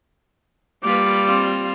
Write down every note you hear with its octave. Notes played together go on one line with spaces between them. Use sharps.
G3 A#3 F4 B4 D6
C4 F4 C5